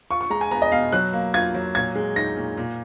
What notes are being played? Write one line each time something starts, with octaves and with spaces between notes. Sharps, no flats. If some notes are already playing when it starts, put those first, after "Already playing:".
F4 C#6
C#6
G#3 A#5
G#5
B3 A#5
D#5
B2 F5
F#3 F#6
A#3
F4 G#6
F#3
A#2 G#6
G#3
D#4 A#6
A#2
A#2